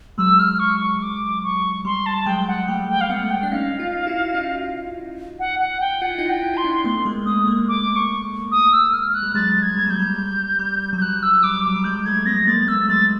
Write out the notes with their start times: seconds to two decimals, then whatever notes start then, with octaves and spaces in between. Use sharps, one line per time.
0.18 F#3 G#3 E6
0.39 F6
0.59 C#6
0.81 C#6
1.02 D6
1.44 C#6
1.85 G3 C6
2.06 A5
2.26 F#3 G#3 G5
2.48 F#5
2.68 G3 A3 G5
2.89 G5
3.01 F5
3.10 A3 B3 F#5
3.30 G5
3.43 D4
3.51 C#4 D#4 F5
3.79 D#4 F4
4.07 E4 F#4
4.25 F#4
4.34 D#4 F4
5.39 F#5
5.59 F#5
5.80 G5
6.02 F4 F#5
6.10 E4
6.18 D#4 F4
6.29 G5
6.43 E4
6.54 F4 C6
6.64 D4 E4
6.84 A3 B3 C6
7.05 G#3 A#3
7.26 A3 B3 D#6
7.47 G#3 A#3
7.69 D6
7.96 C#6
8.52 D#6
8.72 E6
8.93 F6
9.14 F#6
9.23 G3
9.35 F#3 G#3 A6
9.62 G#6
9.77 G3
9.87 F#3 G6
10.00 G3
10.18 G3
10.59 G3
10.93 F#3
10.97 G6
11.02 G3 F#6
11.23 E6
11.43 G3 D6
11.64 F#3 D6
11.76 G3
11.84 F#3 G#3 G6
12.06 G3 A3 G#6
12.26 A3 B3 A#6
12.47 G#3 A#3 A6
12.67 A3 B3 E6
12.88 F#3 G#3 A6